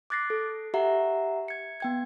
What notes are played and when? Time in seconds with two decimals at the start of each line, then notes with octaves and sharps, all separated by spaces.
0.10 D6 F#6 A6 A#6 C7
0.30 A4
0.74 G4 E5 F#5 A#5
1.48 G#6 C#7
1.80 B3 G5 G#6